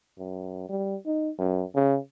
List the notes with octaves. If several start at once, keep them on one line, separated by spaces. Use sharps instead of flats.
F#2
G3
D#4
F#2
C#3